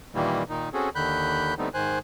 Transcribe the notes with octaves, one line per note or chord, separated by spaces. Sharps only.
A#2 D#3 E3 G3 A#3
A#2 D#3 D#4
C4 C#4 F#4 G#4 A4
D#2 D3 D#3 B5 F#6 G6
D3 G3 A3 B3 C4 D#4
G#2 D#3 C5 G#5 F#6